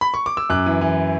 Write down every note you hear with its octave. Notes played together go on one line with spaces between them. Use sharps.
B5
C#6
D6
E6
F#2 D6 F#6
E3
E3